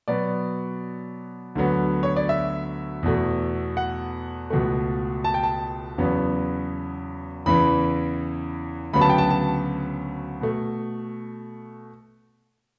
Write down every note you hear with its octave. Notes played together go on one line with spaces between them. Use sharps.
B2 F#3 B3 D5
D2 D3 F#3 B3
C#5
D5
E5
E2 B2 A3
F#5
C#2 B2 A3
A5
G5
A5
E2 C#3 F#3 B3
E2 C#3 E3 B5
D2 C#3 F#3 B3 B5
A5
G5
A5
A5
B2 A3